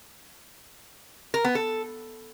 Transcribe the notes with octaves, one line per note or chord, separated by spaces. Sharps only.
A#4
B3
A4